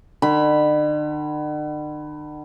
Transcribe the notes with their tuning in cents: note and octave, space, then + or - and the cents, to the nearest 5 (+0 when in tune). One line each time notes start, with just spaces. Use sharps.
D3 +45 B5 +0